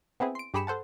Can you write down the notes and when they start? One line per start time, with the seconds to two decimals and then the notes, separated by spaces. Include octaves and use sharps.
0.20 B3 C4 E4 G#4
0.35 C6 D7
0.54 G2 G4 G#4 B5 C#7 E7
0.67 A4 C5 F#5 A5